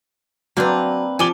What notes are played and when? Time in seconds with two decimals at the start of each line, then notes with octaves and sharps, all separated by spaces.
0.57 F#3 A#3 C4 D4 B4 A#5
1.19 F3 G4 A4 D5 G#5 D6 G7